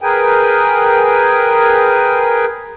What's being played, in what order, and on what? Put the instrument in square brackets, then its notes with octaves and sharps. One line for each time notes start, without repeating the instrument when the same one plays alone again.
[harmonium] G#4 A#4 B4 G5 G#5